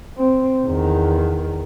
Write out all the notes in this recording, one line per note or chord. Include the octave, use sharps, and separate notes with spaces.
C4
E2 D#3